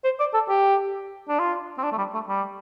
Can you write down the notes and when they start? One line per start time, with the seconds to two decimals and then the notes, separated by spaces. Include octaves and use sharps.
0.04 C5
0.20 D5
0.34 A4
0.49 G4
1.29 D4
1.39 F4
1.78 C4
1.83 D4
1.92 A3
1.98 G3
2.14 A3
2.28 G3